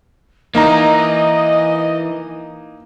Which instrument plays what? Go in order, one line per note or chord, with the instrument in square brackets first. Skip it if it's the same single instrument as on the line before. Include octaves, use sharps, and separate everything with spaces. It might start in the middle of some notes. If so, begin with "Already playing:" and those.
[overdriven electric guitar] E3 [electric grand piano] A#3 D#4 A#5 [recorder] D#5